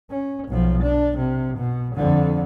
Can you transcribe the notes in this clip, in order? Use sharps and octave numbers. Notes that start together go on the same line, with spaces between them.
C#4
B1 F3
D4
C3
B2
F2 D3